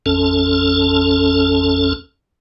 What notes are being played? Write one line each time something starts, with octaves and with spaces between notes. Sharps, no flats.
A1 F2 C#4 A4